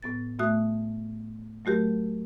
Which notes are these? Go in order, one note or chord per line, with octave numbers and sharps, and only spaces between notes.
A2 B3 A6
A2 A3 F#4 E5 D#6 F#6
F#3 A3 F#4 G4 A#4